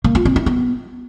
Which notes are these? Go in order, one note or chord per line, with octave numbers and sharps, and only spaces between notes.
A#3
F4
C4
E4
B3